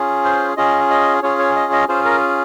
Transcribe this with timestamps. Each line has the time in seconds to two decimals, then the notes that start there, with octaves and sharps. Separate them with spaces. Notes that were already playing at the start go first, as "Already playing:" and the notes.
Already playing: C#4 F4 G#4
0.25 C5
0.57 C#4 F4 G#4 D#5
0.90 D#5
1.22 C#4 F4 G#4 C#5
1.39 C#5
1.56 D#5
1.72 D#5
1.88 C#4 F4 G#4 C5
2.05 A#4